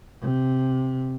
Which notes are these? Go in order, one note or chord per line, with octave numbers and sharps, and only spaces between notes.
C3